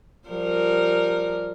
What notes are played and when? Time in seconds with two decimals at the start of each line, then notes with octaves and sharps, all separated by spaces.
0.28 F3 G3 A#4